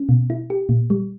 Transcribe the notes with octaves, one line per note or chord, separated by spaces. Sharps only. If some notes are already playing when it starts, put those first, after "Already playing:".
Already playing: C#4
B2
E4
G4
A#2
G3